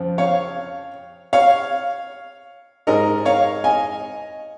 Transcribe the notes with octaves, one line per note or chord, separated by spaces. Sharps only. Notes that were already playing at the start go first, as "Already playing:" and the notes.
Already playing: F2 C#3 F3
C#5 F5
C#5 F5
G#2 G#3 A#4 D#5
C#5 F5
D#5 G#5